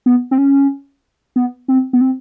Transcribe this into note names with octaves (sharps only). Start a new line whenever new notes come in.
B3
C4
C#4
B3
C4
B3
C4